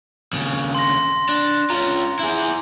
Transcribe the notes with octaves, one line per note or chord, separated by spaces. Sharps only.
D#2 C#3
C6 A#6
D4
C#4 F4 A#5
E4 G#4